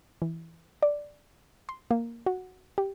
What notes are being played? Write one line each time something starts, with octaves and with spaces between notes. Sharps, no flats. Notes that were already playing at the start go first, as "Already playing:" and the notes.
E3
D5
C6
A#3
F#4
G4